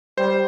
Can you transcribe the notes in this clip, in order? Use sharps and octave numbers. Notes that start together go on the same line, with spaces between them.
G3 C5